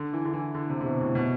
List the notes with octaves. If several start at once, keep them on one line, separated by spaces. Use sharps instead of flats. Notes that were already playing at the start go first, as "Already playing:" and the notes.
Already playing: D3
E3
D3
E3
D3
C3
C3
B2
A2
B2